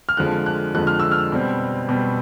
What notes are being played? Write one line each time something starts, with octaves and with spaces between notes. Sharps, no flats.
F6
F2 D3 F3 G#3 F#6
F#6
F2 D3 F3 G#3 F#6
F6
E6
F6
B2 G3 C4
B2 G3 C4